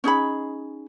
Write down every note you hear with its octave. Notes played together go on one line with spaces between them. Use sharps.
C#4 D#4 G#4 B5